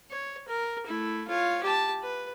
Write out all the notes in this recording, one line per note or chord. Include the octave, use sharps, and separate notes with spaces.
C#5
A#4
A3 E4
F4 C#5
G4 A5
B4